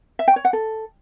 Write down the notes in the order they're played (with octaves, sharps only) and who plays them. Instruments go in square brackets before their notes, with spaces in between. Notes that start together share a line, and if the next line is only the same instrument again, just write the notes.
[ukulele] E5
G5
C#5
F#5
A4